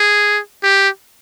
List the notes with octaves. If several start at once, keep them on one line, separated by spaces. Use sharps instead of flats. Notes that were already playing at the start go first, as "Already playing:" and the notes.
Already playing: G#4
G4